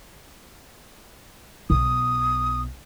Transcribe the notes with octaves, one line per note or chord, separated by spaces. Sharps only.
B1 B3 D#6